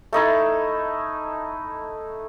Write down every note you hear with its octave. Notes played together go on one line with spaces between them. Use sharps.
A3 D#4 E4 A4